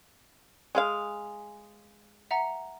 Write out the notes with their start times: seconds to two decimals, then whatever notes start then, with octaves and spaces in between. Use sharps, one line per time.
0.75 G#3 G#4 F5
2.31 E5 F#5 A#5